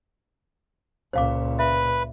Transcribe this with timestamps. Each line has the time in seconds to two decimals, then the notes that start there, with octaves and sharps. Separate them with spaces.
1.13 C#2 A#2 C5 F5 D6
1.59 B4 E5